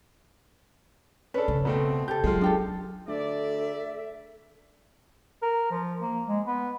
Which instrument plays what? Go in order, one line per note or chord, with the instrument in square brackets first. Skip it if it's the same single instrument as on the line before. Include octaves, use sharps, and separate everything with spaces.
[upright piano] C#4 D4 A4 [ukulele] B4
[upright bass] C#3
[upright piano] B2 A3 C4
[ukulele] G4 A4 [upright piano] G6
[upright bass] F#3 [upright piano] G#3 F4
[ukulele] D4 G4 A4
[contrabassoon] D2 [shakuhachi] A4 [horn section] D5 [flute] E5
[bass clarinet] A#4
F3
A#3
G#3
B3